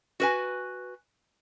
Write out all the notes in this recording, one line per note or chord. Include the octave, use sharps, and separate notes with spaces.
F#4 B4 G#5